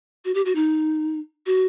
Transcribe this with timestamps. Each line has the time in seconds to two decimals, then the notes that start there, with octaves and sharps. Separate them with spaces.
0.25 F#4
0.35 G4
0.45 F#4
0.55 D#4
1.46 F#4